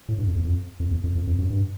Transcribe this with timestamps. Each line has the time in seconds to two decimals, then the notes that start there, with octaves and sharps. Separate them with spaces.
0.09 A2
0.18 G2
0.27 F2
0.35 E2
0.44 F2
0.80 F2
0.91 E2
1.04 F2
1.15 F2
1.27 F2
1.38 F#2
1.50 G2